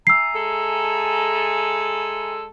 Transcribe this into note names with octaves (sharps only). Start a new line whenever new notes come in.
E5 G#5 A#5 E6 C7
G#3 A4